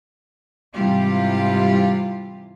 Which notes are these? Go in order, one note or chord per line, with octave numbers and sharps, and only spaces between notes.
G#2 C3 E3 G3 F4 G4